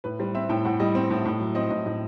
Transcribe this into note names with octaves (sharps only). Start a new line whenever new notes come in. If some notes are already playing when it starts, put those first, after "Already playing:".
A2 B4
G3 C5
C4 E5
A2 G5
A2 F#5
G3 D#5
C4
A2
A2
F#3
C4 D#5
A2 D#5
A2 D#5